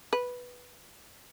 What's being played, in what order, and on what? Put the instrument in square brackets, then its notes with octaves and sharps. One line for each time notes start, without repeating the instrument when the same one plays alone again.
[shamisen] B4